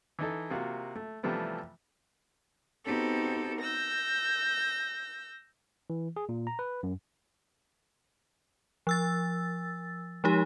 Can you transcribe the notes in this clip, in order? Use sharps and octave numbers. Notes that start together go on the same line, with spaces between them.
E3 D#4 A4
C3 A#3 F4 F#4
A3
C3 E3 F3 G3 A3 B3
B3 C4 D#4 F#4 G4 A4
E6 G6 A#6
E3
G#4
A#2
A#5
B4
F#2
F3 E6 A6
F3 G#3 D#4 G4